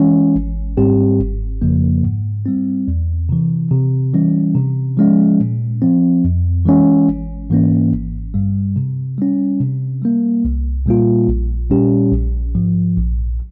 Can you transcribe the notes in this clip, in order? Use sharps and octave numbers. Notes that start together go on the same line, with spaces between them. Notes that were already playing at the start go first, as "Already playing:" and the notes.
Already playing: E3 G#3 C#4
G#1
G#2 G3 C4 G4
G1
F2 C#3 F3 A#3
G#2
G3 C4
E2
C3 E3
C3
E3 G3 C#4
C3
F3 G#3 C#4
A#2
F3 C4
F2
E3 G#3 C#4
G#1
G#2 E3 A#3 C#4
G#1
G2 G3
C3
G3 C#4
C3
G3 A#3
C2
A#2 G3 A#3 F4
A#1
A#2 G3 C#4 G4
A#1
G#2 F3
A#1